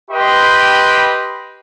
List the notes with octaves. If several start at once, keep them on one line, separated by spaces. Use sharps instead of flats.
G4 B4 D#5 G5 B5 C6